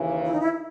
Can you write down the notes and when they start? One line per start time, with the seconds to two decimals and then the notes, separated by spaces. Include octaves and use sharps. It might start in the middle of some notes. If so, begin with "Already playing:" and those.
Already playing: D#2 C#3 E3
0.26 E4
0.33 D#4
0.41 E4